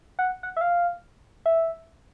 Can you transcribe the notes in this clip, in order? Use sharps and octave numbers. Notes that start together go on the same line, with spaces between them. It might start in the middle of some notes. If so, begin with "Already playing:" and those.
F#5
F#5
E5
F5
E5